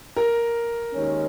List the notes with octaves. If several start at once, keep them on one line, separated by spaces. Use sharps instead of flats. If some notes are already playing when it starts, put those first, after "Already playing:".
A#4
D#2 D#3 G#3 C#4